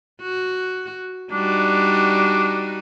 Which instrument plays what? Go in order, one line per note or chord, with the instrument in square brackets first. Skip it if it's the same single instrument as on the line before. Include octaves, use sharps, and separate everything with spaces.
[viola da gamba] F#4
[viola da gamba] G3 D#4 F#4 [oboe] D4